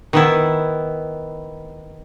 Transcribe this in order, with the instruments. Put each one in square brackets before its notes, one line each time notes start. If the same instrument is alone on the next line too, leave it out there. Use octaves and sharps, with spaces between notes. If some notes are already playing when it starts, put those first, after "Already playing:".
[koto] D#3 B3 E4